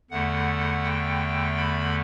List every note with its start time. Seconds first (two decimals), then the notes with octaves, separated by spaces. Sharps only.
0.10 E2 D3 A3 F#5
0.84 G5
1.57 B5